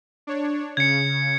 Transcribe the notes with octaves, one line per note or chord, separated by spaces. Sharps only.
D4 C#5
C#3 G#6 C#7